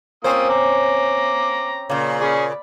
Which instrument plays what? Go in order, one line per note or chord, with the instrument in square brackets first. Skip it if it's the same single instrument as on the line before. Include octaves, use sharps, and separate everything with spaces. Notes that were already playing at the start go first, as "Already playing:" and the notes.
[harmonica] A#3 F4 D#6 [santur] C4 C#4 C#5 [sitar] C5
[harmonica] A#5 D6
[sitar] A#2 C#3 [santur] A#3
[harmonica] C#4 G#4 C#5 [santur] D5 B5